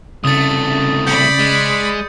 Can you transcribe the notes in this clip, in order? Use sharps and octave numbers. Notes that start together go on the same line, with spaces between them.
C2 C#3 A3 D#6 A6
D5 B5 G6 C#7
G#3